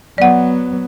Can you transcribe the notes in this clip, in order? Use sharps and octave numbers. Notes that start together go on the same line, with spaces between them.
F#3 B3 D5 F#5